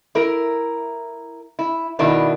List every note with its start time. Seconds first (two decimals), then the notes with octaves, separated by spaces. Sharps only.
0.15 E4 A#4
1.59 E4
1.99 B2 D#3 D4 E4